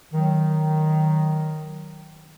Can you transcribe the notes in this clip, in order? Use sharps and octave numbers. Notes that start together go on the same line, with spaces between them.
D#3 F#3